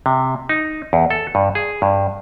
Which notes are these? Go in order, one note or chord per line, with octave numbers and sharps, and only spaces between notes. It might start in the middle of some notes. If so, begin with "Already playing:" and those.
C3
D#4
E2
A4
G2
G#4
G2